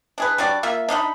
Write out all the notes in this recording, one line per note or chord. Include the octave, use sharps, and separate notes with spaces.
D4 G#4 B4
G3 D4 F#4 D5
A#3 F4 E5
D4 D#4 F5 B5